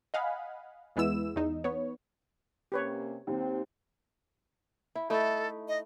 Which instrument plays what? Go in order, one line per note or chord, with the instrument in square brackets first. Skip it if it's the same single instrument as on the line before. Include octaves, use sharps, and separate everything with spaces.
[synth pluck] D#5 F5 F#5 G#5 B5
E2 G#3 B3 E4 E6 E7
E2 D#4
B3 C#5
[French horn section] C3 A#3 C#4 [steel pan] G4 B4 C#5
[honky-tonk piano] D#2 [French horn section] C4
[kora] E4
[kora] A3 D#4 E4 [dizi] A4
[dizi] D#5